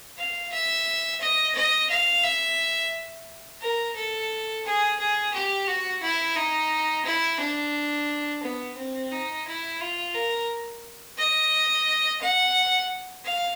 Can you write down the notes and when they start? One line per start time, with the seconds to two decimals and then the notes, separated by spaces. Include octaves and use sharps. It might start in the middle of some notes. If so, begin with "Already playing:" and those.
0.17 F5
0.52 E5
1.20 D#5
1.55 D#5
1.89 F5
2.24 E5
3.61 A#4
3.96 A4
4.65 G#4
4.99 G#4
5.33 G4
5.67 F#4
6.02 E4
6.36 D#4
7.05 E4
7.40 D4
8.43 B3
8.77 C4
9.12 D#4
9.47 E4
9.81 F4
10.15 A#4
11.18 D#5
12.21 F#5
13.24 F5